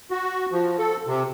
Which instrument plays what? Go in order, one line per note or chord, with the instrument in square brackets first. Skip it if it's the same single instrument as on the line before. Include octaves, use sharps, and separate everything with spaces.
[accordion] F#4
F3
A4
C3